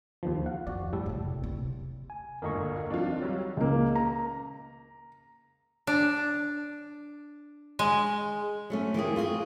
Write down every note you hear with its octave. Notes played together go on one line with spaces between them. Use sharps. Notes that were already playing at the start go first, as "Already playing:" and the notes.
D#2 D#3 F3
F5 F#5
F2 F#4 D5
A2 G3 A4
F#1 C3
C3
G#5
G1 D2 A#2 A#4 D#5 C#6
E3 F#3 C4 D4 D#4 F4
F#3 G3 F#4 C#5
C#2 A#3
A#5
D4
G#3
F#3 A3 C#4
E3 A#3 G4 G#4
F4 F#4 G#4